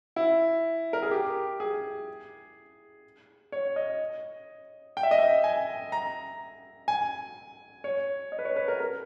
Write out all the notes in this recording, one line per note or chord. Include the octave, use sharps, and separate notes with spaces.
E4
A#4
G#4
G4
G#4
C#5
D#5
G5
E5
D#5
E5
G#5
A#5
G#5
C#5
D#5
B4
C#5
B4
A#4
A#4